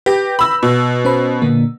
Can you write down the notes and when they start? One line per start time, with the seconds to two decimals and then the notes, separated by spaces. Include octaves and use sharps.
0.06 G4 B4 G6 A#6
0.39 B5 E6
0.63 B2
1.05 C#4 C5 B5
1.42 A#2 D3 A#3